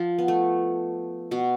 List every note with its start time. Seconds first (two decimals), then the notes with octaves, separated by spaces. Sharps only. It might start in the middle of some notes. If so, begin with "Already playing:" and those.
Already playing: F3
0.19 B3
0.28 A3
1.31 B2 B3